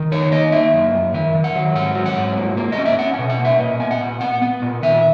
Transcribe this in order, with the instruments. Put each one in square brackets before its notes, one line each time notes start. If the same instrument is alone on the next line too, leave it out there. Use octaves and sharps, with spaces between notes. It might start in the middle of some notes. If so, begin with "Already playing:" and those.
Already playing: [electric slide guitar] D#3
D#4 C#5
A#3 D#5
A#3 E5
F#2
F#2
D#3 E5
D#3
F#5
F#3
G#2 F#5
F#3
F#5
G#2
A#3
A#3
D#5
C#4
E5
C#4 F#5
B2 G#5
F#5
A#3
E5
A#2 D#5
B3 G#5
F#5
A#2
B3 F#5
B3
A#2
D#3 E5